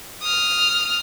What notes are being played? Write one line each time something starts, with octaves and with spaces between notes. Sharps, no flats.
D#6 F6